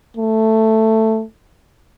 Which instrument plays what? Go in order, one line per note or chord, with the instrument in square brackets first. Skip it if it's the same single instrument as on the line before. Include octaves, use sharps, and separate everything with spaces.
[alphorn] A3